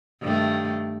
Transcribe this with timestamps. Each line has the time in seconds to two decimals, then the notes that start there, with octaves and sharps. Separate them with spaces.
0.21 G2 D#3 A3